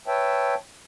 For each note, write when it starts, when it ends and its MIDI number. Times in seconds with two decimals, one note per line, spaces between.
0.07 0.55 71
0.07 0.55 73
0.07 0.55 76
0.07 0.55 79
0.07 0.55 81